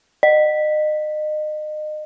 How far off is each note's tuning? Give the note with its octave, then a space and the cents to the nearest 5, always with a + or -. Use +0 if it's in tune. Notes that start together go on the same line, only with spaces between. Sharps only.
D#5 -30